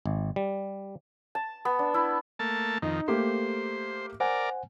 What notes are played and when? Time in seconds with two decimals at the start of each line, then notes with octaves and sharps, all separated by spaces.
0.06 G#1
0.36 G3
1.35 A5
1.65 B3
1.79 D4
1.94 E4
2.39 A3 A#3 A5
2.82 F2 D#3 D#4
3.08 A3 A#3 G4 C5
4.20 A#4 C5 D5 F#5 G#5